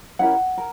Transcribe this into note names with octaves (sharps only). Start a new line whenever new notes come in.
C#4 E4 G4 A#4 F#5
A#4